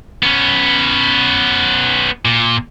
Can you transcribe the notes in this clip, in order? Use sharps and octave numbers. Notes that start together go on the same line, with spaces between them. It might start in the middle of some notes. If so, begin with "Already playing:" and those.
B3 C#4
A#2